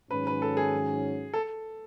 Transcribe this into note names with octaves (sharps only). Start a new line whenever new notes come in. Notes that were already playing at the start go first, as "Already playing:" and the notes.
G#2 D#3 F#3 C#4 B4
B4
A4
G#4
A4